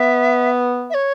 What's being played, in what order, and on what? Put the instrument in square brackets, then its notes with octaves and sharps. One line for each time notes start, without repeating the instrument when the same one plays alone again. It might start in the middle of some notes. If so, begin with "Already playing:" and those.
Already playing: [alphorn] B3 [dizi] E5
[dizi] E5
C#5